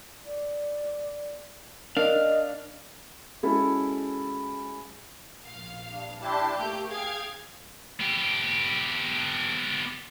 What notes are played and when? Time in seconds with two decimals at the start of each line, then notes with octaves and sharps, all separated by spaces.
0.25 D5
1.97 D4 A#4 D#5 F5
3.43 G#3 C#4 E4 F#4 A4
5.45 A#1 F5
5.89 G2
6.22 D4 E4 G4 A5 C6
6.57 A3 A#3 G4 G6
6.89 G#4 F5 G5 G#6
8.00 B3 G4